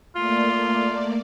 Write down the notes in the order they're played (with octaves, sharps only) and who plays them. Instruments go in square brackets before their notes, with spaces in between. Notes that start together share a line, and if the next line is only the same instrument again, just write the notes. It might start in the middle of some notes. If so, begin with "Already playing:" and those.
[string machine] A3 A#3 D5 [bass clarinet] F4